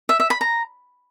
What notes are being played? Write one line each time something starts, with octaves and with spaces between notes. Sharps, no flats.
E5
E5
B5
A#5